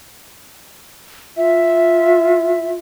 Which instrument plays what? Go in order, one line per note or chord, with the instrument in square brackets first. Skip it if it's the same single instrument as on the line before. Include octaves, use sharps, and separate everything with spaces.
[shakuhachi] F4 [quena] E5